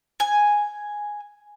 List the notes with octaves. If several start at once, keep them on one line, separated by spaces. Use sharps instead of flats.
G#5